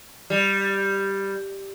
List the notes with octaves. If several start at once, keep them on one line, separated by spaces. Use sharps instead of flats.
G3